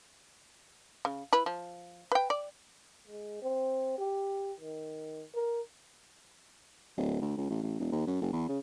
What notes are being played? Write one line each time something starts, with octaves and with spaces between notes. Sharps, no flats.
C#3
E4 B4
F3
B4 G5
D5
G#3
C4
G4
D#3
A#4
D1
D2
C#2
A1
A1
E1
D#2
F#2
F#1
E2
C#3